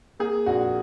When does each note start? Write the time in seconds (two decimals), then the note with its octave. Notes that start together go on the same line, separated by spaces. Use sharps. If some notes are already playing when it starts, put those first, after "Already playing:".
0.19 A#3 G#4
0.46 A#1 F#4